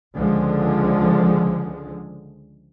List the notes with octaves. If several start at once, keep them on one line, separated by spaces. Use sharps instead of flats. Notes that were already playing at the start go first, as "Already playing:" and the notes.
C#2 D3 F3 G#3